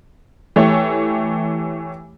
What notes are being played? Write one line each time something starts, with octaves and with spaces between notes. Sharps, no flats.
E3 A3 G4 C#5